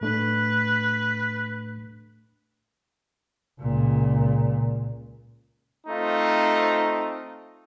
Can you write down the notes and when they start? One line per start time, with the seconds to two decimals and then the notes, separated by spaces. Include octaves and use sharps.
0.01 A2 A3 D4 B4
3.61 C#2 A#2
5.87 A3 C4 D#4 F4